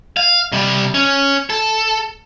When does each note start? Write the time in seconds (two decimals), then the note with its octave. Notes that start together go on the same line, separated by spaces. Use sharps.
0.17 F5
0.52 C3 G3
0.94 C#4
1.50 A4